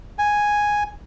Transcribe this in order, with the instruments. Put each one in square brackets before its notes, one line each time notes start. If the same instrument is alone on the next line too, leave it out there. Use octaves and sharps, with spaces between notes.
[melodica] G#5